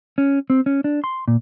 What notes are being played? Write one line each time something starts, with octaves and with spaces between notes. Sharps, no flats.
C#4
C4
C#4
D4
C6
A#2